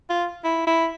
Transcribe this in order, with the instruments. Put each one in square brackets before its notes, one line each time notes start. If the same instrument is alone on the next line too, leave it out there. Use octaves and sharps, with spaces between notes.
[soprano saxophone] F4
E4
E4